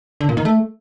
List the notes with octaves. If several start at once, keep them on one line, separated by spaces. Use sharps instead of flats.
D3
A#2
D#3
A3